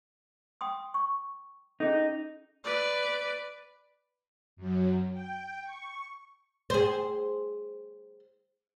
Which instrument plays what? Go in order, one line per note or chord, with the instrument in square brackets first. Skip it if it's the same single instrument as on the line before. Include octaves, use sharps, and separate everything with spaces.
[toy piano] G5 C6 D#6
C#6
[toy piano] C#4 G#4 A4 [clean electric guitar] D#4
[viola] B4 D5
[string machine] F#2 F#3
G5
C#6
[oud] G#4 C5